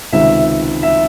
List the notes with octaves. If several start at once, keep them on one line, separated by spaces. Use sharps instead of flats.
C#2 C3 D#3 E5
E5